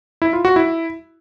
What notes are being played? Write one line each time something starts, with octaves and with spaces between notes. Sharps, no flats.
E4
F4
F#4
E4